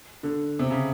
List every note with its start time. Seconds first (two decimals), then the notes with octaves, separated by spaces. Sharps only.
0.23 D3
0.59 C3
0.70 C#3